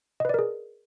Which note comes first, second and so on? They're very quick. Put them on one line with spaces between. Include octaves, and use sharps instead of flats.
D#5 B4 D5 A#4 G#4